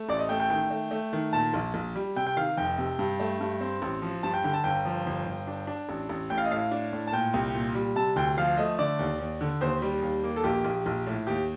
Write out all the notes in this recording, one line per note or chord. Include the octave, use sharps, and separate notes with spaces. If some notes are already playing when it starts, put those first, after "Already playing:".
Already playing: A3
A1 D5
D#5
A3 G5
G5
D#3 G5
A3
A3
D#3
A#2 A5
A#1
A#1
G3
C3 G5
G5
D#3 F5
F1 G5
C3
G2
A3
G2
C4
A1
F3
G2 A5
G5
D3 G5
A5
G1 G5
F3
G1
G1
D4
D4
A1
A1
A2 G5
F5
D#5
A2 F5
D4
A2
A5
A#2 G5
C2
A#2
G3
C3 A5
D2 G5
F3 F5
A3 D#5
D3 D5
D#2
D#2
D3
D#2 C5
G3
D#2
A#3
A4
A#1 G4
A#1
A#1
A2
D#2 G4